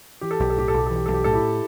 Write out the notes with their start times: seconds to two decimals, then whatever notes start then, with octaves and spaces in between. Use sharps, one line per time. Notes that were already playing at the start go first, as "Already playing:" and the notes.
0.21 E3 G4
0.31 A4
0.39 B1 G4
0.50 A4
0.57 A2 G4
0.68 A4
0.74 B1 G4
0.86 E3 A4
0.96 G4
1.06 B1 A4
1.14 G4
1.24 A2 A4
1.33 E4 G4